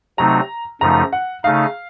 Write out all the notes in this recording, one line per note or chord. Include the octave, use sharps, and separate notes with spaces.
C3 F#3 A3 C4 D#4 A#5
F#2 C#3 F3 A3 D#4 A#5
F#5
C#3 A3 D#4 F5